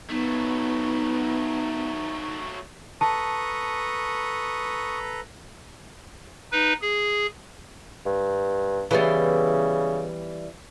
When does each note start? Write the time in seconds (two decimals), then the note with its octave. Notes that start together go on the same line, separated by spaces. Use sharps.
0.09 F#3 A3 B3 D#4
3.01 A4 B4 A5 A#5 C#6 D#6
6.52 D#4 B4
6.81 G#4
8.06 G2
8.91 C#3 E3 G3 B3